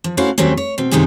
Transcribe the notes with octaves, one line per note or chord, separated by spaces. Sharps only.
F3
A3 C#4 E4 F#4 C5 F5
D#2 F#3 G3 A3 C4 C#4
C#5
B2 C4
F#2 C3 D#3 D#4 G4 G#4